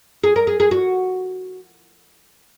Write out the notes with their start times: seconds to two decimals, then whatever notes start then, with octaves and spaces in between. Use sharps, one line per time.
0.23 G#4
0.36 A#4
0.47 G#4
0.60 G#4
0.71 F#4